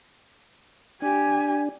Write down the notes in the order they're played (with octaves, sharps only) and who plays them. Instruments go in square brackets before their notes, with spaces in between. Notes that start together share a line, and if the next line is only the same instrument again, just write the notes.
[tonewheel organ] D4 [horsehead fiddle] G4 G#5